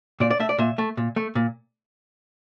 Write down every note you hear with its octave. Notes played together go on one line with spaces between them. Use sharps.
A#2 D5
D5
A3 E5
D5
A#2 E5
A3
A#2
A3
A#2